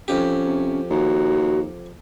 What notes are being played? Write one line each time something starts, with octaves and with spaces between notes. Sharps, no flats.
F2 C#4 G4
C3
D#2 F#4